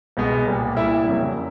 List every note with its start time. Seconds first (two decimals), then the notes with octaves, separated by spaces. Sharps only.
0.17 C2 B2 G#3 B3
0.46 C2 A#2 G3
0.77 C2 A#2 G3 E4 E5
1.07 F2 C#3 F#3 A#3